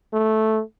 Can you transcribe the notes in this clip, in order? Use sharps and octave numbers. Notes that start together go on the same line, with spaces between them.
A3